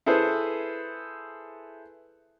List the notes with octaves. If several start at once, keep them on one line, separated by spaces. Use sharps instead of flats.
E4 G#4 A4 B4 C5